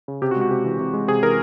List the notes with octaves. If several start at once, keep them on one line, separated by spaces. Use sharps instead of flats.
C#3
C3 G4
F#4
G#3
F#4
C3 G4
E3
C3
G#3
C3 G#4
E3 A#4